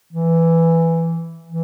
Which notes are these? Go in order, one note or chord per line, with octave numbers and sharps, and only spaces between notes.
E3
E3